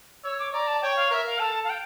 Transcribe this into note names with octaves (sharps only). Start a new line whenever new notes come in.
C#5 E6
D6
D5 A#5
A5
C#5 G5
F5
A#4 E5
F5
A4 A5
F5
G5